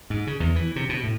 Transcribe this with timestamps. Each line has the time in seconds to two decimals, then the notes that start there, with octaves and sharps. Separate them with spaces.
0.10 G#2
0.27 C#3
0.40 E2
0.56 E3
0.76 C3
0.89 B2
1.03 A2